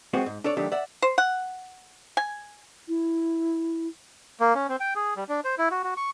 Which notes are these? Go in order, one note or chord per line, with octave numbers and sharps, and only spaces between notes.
G#3 B3 C4 F#4
G#2
D4 A4 C#5 D5
D3 D#3 F#3 A3 D4 G4
D5 E5 F#5
C5
F#5
G#5
E4
A#3
C#4
C4
G5
G#4
G3
D4
C5
E4
F#4
F#4
C#6